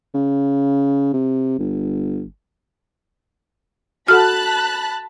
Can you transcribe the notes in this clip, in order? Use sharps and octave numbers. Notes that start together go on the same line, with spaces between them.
C#3
C3
G1
F#4 A4 F#5 A5 B5 F6 F#6